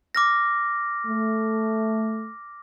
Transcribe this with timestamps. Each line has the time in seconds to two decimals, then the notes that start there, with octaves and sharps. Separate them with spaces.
0.15 D6 F6 A#6
1.07 A3